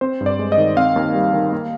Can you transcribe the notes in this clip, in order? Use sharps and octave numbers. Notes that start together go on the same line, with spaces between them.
C4 C5
G2
D5
G#3
D#5
D#3
C4 F5
D#2
G3
D#3
A#3